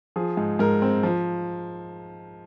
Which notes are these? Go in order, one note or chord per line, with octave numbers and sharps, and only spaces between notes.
F3 G#4
G#2
G#2 A#4
C4
F3